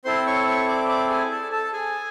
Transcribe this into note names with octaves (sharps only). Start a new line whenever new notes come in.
C4 E4 A4 C5 C6
C#5 C#6
C#5 C#6
D5 D6
D5 D6
G#4 G#5
A4 A5
A4 A5
G#4 G#5